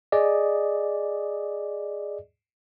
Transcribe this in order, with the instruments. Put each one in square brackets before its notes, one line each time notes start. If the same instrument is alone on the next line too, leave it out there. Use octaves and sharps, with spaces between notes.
[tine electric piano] G#4 D5 D#5